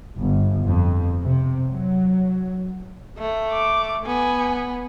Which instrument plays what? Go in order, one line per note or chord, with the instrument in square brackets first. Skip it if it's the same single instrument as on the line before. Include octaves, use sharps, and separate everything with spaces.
[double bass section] G1
F2
C3
F#3
[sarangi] A3
[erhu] D6
[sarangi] B3 [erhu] G#5